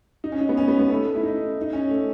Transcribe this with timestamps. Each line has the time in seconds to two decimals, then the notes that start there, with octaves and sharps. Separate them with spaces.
0.24 D#4
0.32 C#4
0.41 D#4
0.49 B3
0.57 C#4
0.68 B3
0.79 B3
0.90 A3
1.15 E4
1.23 D#4
1.61 D#4
1.73 C#4
1.89 A3